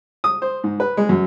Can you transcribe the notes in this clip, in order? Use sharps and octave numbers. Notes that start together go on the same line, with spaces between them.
D#6
C5
G#2
B4
G#3
F#2